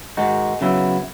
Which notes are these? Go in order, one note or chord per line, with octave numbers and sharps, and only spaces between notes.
G#2 D#3 G#3 D#4 F#4
C#3 F#3 B3 E4